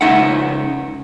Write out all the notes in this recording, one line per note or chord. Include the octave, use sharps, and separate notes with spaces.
C#2 D#4 E5 F#5